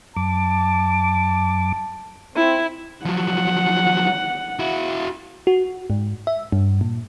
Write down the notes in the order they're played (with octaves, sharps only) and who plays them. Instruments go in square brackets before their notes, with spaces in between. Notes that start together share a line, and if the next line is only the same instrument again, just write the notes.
[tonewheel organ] F#2 D6 [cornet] A5
[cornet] C4 [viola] E4
[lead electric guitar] F3 F#3 [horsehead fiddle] F#5
[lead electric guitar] E4 F#4
[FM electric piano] F#4
G#2
E5
G2
A#2